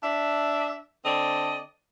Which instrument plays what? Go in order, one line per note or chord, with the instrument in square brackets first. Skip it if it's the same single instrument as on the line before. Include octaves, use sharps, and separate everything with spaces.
[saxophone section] D4 E5
D3 C4 D5 D#5